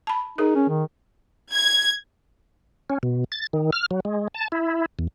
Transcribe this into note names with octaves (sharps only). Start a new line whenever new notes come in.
A5 B5
D#4 G#4 A#4
C#4
D#3
G#6
C#4
B2
A6
D#3
F6
F#3
G#3
A5
E4
E2